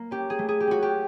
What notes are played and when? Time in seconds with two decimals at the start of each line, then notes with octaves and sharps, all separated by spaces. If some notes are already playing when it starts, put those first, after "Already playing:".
Already playing: A#3
0.11 C#4 G4
0.30 G#4
0.39 A3
0.49 G#4
0.60 G4
0.67 C#4 F#4
0.83 G4